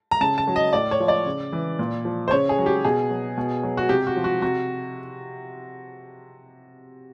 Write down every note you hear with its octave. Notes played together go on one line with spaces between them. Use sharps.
A#5
C#3 A5
A5
F#3
D#5
A2 D5
C#5
F3
D5
C#3
E3
A#2
F3
C5
C#3 C#5
G#4
F#3
G4
B2 G#4
F#3
B2
F#3
F#4
C3 G4
F#4
F3
F#4
C3 F#4